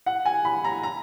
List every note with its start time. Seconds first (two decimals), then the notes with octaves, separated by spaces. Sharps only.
0.06 F#5
0.26 G#5
0.45 B5
0.64 A#5
0.83 A#5